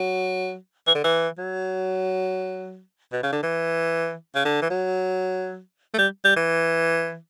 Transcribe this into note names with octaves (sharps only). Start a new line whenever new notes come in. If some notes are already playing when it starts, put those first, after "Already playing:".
Already playing: F#3
E3
D3
E3
F#3
B2
C#3
D3
E3
C#3
D3
E3
F#3
A3
G3
G3
E3